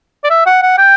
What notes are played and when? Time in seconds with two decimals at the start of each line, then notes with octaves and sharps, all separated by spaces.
0.24 D5
0.30 E5
0.46 F#5
0.62 F#5
0.78 G5